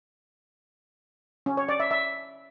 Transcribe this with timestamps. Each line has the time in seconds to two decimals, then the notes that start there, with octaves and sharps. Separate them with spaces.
1.46 C#4
1.57 C#5
1.69 D5
1.80 E5
1.91 E5